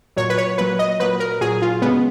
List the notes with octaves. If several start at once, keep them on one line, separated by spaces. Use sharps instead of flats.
A#2 F#3 C#5
B4
C#5
A#2 F#3 B4
D#5
A#2 F#3 B4
A#4
A#2 F#3 G#4
F4
C#3 G#3 B3